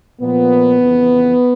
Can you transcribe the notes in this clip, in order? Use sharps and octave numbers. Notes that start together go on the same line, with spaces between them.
A#2 F3 B3
F2 C#3 E3